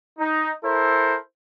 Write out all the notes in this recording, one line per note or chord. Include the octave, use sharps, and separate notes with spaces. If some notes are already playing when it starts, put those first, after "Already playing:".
D#4
E4 A4 A#4 C5